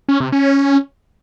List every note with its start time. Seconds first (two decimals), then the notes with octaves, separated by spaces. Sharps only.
0.08 C#4
0.20 C3
0.32 C#4